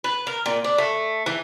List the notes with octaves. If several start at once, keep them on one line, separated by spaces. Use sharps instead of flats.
B4
A#4
A#2
D4
A3
E3